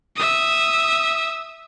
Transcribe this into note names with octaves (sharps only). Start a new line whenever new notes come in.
E5 D#6